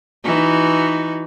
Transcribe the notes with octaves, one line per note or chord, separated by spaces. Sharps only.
E3 D#4 F#4